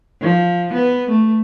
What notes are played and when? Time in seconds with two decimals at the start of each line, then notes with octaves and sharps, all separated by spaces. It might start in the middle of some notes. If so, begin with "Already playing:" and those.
0.21 F3
0.74 B3
1.10 A3